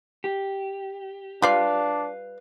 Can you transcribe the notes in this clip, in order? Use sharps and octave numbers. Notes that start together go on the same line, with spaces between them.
G4
G3 D4 F4 B4 D5 F5